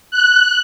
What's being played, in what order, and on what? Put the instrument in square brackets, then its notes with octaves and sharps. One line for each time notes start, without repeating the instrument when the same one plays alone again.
[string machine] F#6